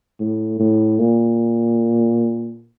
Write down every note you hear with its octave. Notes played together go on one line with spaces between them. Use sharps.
A2
A2
A#2